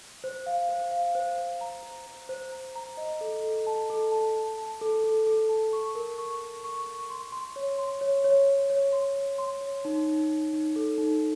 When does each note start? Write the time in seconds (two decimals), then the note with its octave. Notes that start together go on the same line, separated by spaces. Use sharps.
0.24 C5
0.46 F5
0.69 C5
0.91 F5
1.15 C5
1.38 C5
1.61 A#5
1.83 C5
2.06 C5
2.29 C5
2.52 A#5
2.76 A#5
2.97 D#5
3.21 A4
3.43 A4
3.67 A5
3.90 A4
4.12 A5
4.36 A5
4.58 A5
4.81 A4
5.04 A4
5.26 A4
5.49 A5
5.73 C#6
5.95 A#4
6.18 C#6
6.41 C#6
6.64 C#6
6.86 C#6
7.10 C6
7.32 C6
7.56 C#5
7.78 C6
8.01 C#5
8.24 C#5
8.47 C#5
8.70 C#5
8.93 C6
9.16 C#5
9.38 C6
9.61 C#5
9.85 D#4
10.07 D#4
10.30 D#4
10.53 D#4
10.76 A4
10.98 D#4